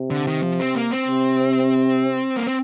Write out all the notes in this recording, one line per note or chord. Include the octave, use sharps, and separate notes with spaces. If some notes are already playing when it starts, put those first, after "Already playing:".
Already playing: C3
D3
D#3
F3
C4
A#3
C4
C3
A#3
C4